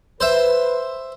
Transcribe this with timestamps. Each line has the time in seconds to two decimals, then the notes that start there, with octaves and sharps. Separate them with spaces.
0.21 B4 C5 E5